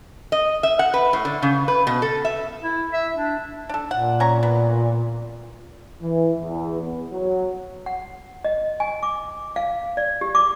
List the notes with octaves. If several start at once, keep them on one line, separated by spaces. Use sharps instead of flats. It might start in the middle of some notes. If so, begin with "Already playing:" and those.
D#5
E5
F#5
B4
A2
D3
C#3
B4
B2
A4
E5
E4
E5
D4
D4 A4
A#2 F#5
C#4 A#5 C#6
B3
E3
E2
B3
F#3
F#5
D#5
G#5
D6
F5
D5
G4
D6